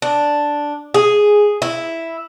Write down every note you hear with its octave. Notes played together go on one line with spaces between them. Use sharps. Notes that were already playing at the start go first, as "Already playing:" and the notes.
D4
G#4
E4